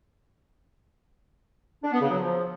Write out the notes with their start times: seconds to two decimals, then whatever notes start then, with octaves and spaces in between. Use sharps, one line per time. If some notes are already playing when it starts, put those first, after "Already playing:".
1.83 D4
1.92 B3
2.01 C#3
2.10 F#3
2.18 F3